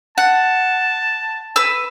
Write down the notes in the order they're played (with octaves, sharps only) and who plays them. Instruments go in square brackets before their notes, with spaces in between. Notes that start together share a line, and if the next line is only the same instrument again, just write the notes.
[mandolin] F#5 [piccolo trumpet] A5
[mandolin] B4 E6